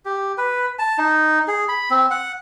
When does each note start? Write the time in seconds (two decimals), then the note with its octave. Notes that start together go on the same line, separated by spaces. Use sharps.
0.05 G4
0.38 B4
0.79 A5
0.98 D#4
1.48 G#4
1.68 B5
1.90 C4
2.11 F#5